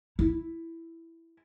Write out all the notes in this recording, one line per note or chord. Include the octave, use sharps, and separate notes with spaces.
E4